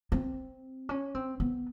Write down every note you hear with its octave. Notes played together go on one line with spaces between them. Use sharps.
C4
C#4
C4
B3